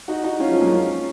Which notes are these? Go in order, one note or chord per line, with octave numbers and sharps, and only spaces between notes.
D#4 F#4
D#4 F#4
C#4 F4
F3 G#3
F#3 A#3
C#4 F4